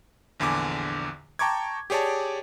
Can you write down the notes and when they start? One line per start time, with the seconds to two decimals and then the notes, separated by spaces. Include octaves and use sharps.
0.40 A#1 E2 D3 G#5 D6
1.39 G5 A5 A#5 C#6 D6 G#6
1.90 G4 G#4 C#5 D5 A5